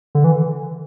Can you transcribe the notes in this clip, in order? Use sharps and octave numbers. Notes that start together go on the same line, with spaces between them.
D3
E3